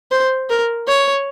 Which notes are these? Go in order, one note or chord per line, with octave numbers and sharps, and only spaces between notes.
C5
A#4
C#5